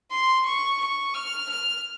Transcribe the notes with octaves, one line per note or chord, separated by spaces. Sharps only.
C6
C#6
C#6
F6
F6